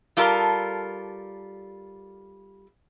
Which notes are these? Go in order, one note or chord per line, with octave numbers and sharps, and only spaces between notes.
G3 F4 A4 A#4